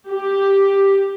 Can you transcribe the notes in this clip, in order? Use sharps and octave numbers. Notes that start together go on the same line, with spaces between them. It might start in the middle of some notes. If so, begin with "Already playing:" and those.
G4